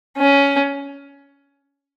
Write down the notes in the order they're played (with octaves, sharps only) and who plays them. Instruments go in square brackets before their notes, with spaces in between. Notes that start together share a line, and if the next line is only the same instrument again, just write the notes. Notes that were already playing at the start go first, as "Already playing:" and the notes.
[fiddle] C#4